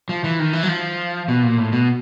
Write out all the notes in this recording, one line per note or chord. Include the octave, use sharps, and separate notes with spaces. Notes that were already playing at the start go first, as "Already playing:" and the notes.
F3
E3
D#3
E3
F#3
F3
B2
A#2
A2
B2